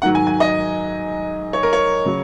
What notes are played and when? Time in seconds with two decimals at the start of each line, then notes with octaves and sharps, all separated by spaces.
0.02 G#2 D#3 F#3 F#5
0.15 G#5
0.27 G#5
0.40 D#5
1.53 C#5
1.63 A#4
1.73 C#5
2.05 C#3 F#3